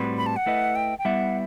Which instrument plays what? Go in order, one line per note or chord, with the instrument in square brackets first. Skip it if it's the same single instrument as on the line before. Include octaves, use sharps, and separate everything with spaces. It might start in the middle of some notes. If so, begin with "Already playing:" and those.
Already playing: [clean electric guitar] A2 G3 C4 F#4 B4
[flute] B5
A5
F#5
[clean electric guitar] A3 E4 B4 D#5
[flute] G5
G5
[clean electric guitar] G3 B3 E4 B4 E5 [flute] F#5